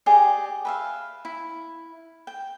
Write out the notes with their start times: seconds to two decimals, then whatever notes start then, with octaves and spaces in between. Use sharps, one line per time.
0.06 G4 G#4 D5 D#5
0.65 B4 E5 F5
1.25 E4
2.27 G5